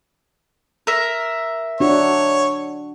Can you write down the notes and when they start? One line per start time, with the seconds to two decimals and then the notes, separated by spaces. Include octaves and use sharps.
0.87 A#4 E5
1.80 D4 F#4 C#5